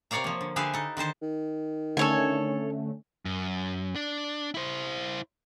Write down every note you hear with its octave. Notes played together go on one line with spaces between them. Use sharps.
C3 A#4 C#5 D5 F5 A#5
F3 A#3
D3
D3 G4 G#4 B4 E5 F5
D#4 A4
D3 D#3 C5 A5
D#3
D3 A3 C#4 A4 C#5 G#5
F#2
D4
E4 C5